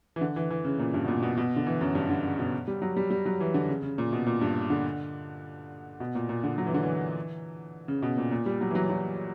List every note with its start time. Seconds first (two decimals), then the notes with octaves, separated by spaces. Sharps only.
0.16 E3
0.21 D3
0.36 E3
0.50 E3
0.65 C#3
0.79 A#2
0.94 G2
1.04 B2
1.08 A#2
1.22 B2
1.37 B2
1.56 D3
1.67 E3
1.81 F#2
1.95 G2
2.09 D3
2.24 C#3
2.39 B2
2.68 G3
2.82 F#3
2.97 G3
3.11 G3
3.26 F#3
3.40 E3
3.54 D3
3.68 C#3
3.83 C#3
3.98 A#2
4.13 B2
4.26 A#2
4.41 G2
4.70 D3
6.00 B2
6.15 A#2
6.29 A#2
6.44 D3
6.58 F#3
6.66 E3
6.74 D3
6.83 E3
7.88 C#3
8.02 B2
8.17 A#2
8.31 A#2
8.46 G3
8.61 F#3
8.71 E3
8.75 F#3
8.90 F#3